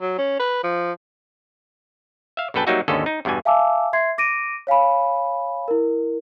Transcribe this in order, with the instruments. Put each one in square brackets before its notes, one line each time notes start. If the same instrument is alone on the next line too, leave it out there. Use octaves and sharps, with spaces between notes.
[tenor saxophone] F#3
C#4
B4
F3
[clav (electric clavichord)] E5 F5
A#1 F#2 A4 B4 G5 A5
F#3 G3 A#3 D#4 F#4 E5
G#1 D#2 D3 C#4 A4 D#5
D#4
E2 G2 B2 E3 G#5
[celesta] E5 F5 G#5 A5 D6 E6
E5 C6 G#6 C7
D6 A#6 D7 D#7
C#5 F5 G#5 B5
E4 A#4